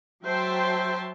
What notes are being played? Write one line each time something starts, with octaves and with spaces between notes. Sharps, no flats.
F#3 C5 E5 G5 A5 C6